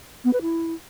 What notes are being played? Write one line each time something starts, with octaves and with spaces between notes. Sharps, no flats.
B3
B4
E4